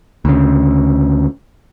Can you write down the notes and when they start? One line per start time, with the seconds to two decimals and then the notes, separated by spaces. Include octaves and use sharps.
0.25 D2 C#3